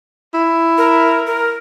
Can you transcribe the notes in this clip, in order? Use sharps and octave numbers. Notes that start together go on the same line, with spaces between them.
E4
A#4
A#4